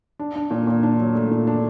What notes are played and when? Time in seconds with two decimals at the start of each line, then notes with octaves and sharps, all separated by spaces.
0.19 D4
0.36 D4
0.51 A#2
0.67 A#2
0.83 D4
1.00 F#3
1.15 A3
1.31 A#2
1.47 D4